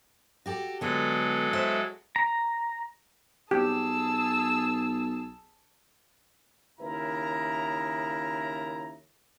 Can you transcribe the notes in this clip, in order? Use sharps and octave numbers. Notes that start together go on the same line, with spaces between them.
F#4 G4 A4
D3 F#3 G#3 B3 A4
E4 C5 E5
A#5
B1 G4 G#4 A5 E6
D#2 C#3 E4 A#4 A#5